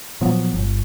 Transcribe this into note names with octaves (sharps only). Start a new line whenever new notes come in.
A#2 F3 F#3 B3
G1